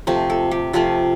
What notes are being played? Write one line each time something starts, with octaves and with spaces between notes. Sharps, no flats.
C3 F3 A3 C5
A4
G4
C3 F3 A3 F4